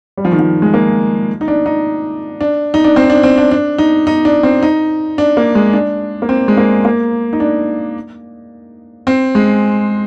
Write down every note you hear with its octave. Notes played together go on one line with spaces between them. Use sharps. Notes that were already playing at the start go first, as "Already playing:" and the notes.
G3
F3
D#3
F3
G#3
A#3
D#4
D4
D#4
D4
D#4
D4
C4
D4
C4
D4
D4
D#4
D#4
D4
C4
D#4
D4
A#3
G#3
D4
A#3
C4
G#3
A#3
A#3
D#4
D4
C4
G#3